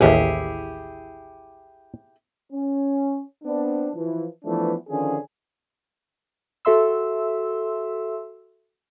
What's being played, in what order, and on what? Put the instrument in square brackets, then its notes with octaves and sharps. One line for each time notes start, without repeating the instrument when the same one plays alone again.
[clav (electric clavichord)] A1 D#2 [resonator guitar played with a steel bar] E4 G4 G#4
[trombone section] C#4
B3 C4 D4
E3 F3
E3 F3 A3 B3 D4
D3 D#3 F3 C#4 G#4
[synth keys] F#4 A4 E5 C6 E6